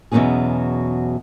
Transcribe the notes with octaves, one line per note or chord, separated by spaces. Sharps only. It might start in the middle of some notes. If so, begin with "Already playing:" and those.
E2 B2 D3 F#3 C#4 G#4